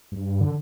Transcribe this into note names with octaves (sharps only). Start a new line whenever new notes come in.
G2
D3